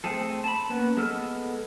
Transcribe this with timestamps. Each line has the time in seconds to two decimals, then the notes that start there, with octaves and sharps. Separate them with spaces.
0.04 A3 C4 G#4 A4
0.44 A5 B5
0.70 A#3 B3 C#4 B4
0.97 G#3 B3 A4 E6 F6